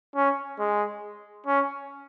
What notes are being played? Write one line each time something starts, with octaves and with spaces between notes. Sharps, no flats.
C#4
G#3
C#4